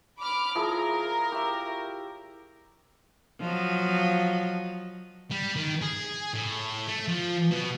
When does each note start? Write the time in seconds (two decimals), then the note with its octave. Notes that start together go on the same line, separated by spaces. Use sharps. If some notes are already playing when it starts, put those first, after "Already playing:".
0.22 B5 D6 F6
0.55 F3 E4 G#4 A#4
1.32 G4 C#5 E5
3.41 F3 F#3 D#5
5.31 G3
5.56 D#3
5.82 G#4
6.35 A2
6.88 A3
7.08 F3
7.51 B2